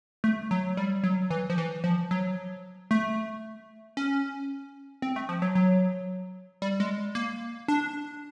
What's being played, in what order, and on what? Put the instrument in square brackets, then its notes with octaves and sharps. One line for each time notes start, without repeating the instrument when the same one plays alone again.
[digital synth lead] A3
F#3
G3
F#3
E3
F3
E3
F3
F#3
A3
C#4
C4
A3
F3
F#3
F#3
G3
G#3
A#3
D4